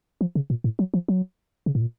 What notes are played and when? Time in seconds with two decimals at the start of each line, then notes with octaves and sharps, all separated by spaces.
0.21 F3
0.35 C#3
0.50 A#2
0.64 A2
0.79 F#3
0.94 F3
1.08 F#3
1.66 C#3
1.75 A2
1.81 A#2